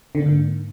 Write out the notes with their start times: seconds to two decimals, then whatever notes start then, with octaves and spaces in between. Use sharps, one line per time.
0.15 D3
0.20 A#3
0.25 G#2